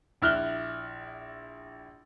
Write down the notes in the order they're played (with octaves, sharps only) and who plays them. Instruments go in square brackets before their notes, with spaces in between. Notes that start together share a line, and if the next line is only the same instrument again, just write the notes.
[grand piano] A#1 E4 F6 F#6 G7